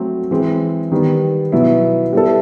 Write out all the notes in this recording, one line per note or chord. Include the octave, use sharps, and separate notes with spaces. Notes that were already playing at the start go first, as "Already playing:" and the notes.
Already playing: F#3 A3 C4
E3 G#3 C4
D#3 G3 B3
B2 F#3 B3 E4
G3 B3 E4 A4